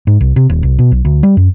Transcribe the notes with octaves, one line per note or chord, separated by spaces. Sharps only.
G#2
C2
C3
D#1
C2
B2
B1
D2
G3
F#2